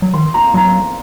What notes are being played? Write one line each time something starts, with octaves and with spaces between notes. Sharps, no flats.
F#3
D#3 C6
A#5
F#3 A#5